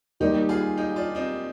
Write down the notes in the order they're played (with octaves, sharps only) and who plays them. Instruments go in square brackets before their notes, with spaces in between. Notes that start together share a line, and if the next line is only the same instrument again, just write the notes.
[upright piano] D#2 D#3 G3 [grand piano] D#4 G4
[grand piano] F4 G#4
D#4 G4
D4 F4
C4 D#4